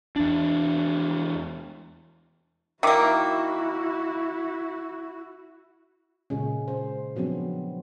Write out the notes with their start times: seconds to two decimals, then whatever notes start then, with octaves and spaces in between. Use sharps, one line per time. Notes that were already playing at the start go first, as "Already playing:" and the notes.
0.16 E2 D4
2.83 D#3 A#3 E4 F#4 E5 D6
6.30 A#2 C#3 G#3 C#4
6.68 C5
7.16 F3 F#3 B3 C4 D4